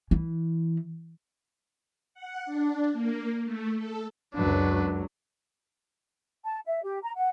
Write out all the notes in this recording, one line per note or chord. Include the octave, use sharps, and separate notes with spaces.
E3
F#5
D4
A#3
A3
A4
C#2 F#2 F#3 D4 B4
A5
E5
G4
A#5
F#5